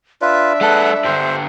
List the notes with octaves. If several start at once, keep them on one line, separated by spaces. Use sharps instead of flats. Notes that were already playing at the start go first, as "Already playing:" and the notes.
D4 F4 B4 E5
G#3 A4 B4 F#5
G2 D3 C5